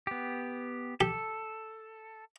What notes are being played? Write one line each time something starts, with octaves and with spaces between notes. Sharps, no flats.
B3 G4
G4 A4